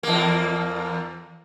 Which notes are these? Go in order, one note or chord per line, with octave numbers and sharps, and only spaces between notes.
E2 A#3